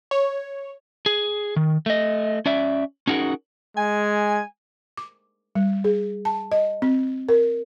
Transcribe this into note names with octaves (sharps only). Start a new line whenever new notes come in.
C#5
G#4
D#3
A3 D#5
C#4 D5 E5
C#4 D#4 F#4 G#4 A#4
G#3 G#5
D6
G3
G#4
A5
D#5
C4
A#4